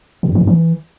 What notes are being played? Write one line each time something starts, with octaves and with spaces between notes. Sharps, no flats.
A#2
F#2
D#3
G2
E3